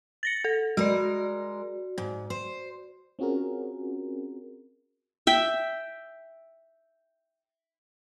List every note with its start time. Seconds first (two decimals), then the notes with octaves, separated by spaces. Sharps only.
0.23 A6 A#6 C#7
0.44 A4
0.77 G#3 F#4 A#4 D5
1.98 G#2
2.30 C5
3.19 C4 C#4 F4 F#4 G#4 A#4
5.27 E5 G5